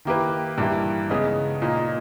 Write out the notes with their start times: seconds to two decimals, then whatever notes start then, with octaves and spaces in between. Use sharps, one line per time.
0.05 D#3 A#3 E4 G4 B4
0.58 G2 E3 A#3 E4 G4
1.09 C#3 G#3 B3 D#4
1.62 A#2 A#3 D#4